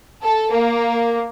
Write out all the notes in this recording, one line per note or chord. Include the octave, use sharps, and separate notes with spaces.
A4
A#3